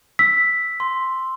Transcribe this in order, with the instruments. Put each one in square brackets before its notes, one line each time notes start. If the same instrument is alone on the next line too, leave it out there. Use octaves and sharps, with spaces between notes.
[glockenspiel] E6 [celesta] B6
[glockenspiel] C6